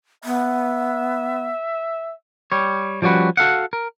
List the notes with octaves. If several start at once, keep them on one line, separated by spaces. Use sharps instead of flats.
B3 E5
G3 C#5
F3 G3 C#4 F#4 B4
F#4 A4 F5 F#5
A#4